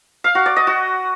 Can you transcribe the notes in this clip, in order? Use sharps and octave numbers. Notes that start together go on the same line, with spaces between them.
F5
F#4
D5
D#5
F#4